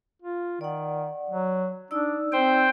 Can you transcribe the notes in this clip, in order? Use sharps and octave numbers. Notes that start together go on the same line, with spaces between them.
F4
D#3 D5 F#5
F#3
D4 D#4 D5 E6
C4 C5 G5